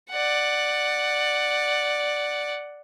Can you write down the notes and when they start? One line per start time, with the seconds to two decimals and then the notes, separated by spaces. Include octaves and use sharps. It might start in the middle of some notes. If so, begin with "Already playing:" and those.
0.11 D5 F#5